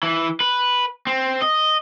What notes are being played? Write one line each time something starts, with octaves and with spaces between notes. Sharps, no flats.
E3
B4
C4
D#5